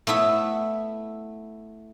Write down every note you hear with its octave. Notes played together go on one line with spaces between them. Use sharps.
A3 B3 E4 E5